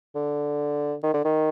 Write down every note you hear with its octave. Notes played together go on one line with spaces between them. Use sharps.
D3
D#3
D3
D#3